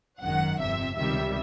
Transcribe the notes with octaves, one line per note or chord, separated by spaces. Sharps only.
G#1 F#2 D#3 F#5
G1 F2 C3 E5
C#2 C3 D#3 G3 E5